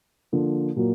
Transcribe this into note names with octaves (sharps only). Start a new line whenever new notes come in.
D3 F3 A#3
A#2 F#3 A#3